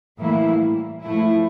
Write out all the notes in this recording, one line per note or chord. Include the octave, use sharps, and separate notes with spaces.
A2 E3 G3 A#3 E4
A2 F3 A3 E4